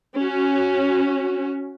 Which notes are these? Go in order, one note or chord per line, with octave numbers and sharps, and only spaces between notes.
C#4 F#4